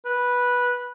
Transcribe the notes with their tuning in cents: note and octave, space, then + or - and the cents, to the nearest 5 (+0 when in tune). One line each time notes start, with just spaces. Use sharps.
B4 -10